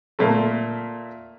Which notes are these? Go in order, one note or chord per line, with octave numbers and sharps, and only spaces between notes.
A#2 A3